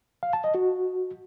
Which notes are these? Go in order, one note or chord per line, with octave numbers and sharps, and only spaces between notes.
F5
A5
D#5
F#4